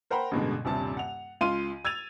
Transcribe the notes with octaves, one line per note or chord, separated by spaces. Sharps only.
A#4 C5 F#5 G5 A#5 B5
A1 G2 B2 D3 G#3
D#1 G2 C3 A5
F#5 F7
C#2 F4 F5 C6 D#7
E6 G#6 A6 D#7 F7